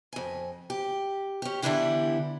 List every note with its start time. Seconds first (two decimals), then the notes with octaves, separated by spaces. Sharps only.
0.13 F2 G#5
0.70 G4
1.42 C#4 G4
1.62 D3 E3 B3 D4 E4 G4